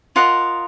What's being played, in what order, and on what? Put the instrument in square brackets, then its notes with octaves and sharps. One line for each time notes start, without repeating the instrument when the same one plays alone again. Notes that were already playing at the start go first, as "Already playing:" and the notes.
[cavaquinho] F4 A#4 D#5 F#5